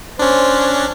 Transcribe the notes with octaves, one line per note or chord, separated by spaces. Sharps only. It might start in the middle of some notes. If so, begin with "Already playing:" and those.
C#4 D4 C5